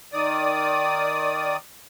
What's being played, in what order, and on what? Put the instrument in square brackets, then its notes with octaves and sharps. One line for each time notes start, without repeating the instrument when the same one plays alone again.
[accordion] D#3 D5 D#6